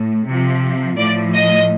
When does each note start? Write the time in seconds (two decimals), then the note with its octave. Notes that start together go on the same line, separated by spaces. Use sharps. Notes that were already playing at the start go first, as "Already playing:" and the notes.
Already playing: A2
0.26 C3 F3
0.97 A2 F3 D5
1.34 D#5